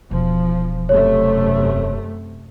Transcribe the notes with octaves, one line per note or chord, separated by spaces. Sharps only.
E1 F3
F#2 C3 A3 C#5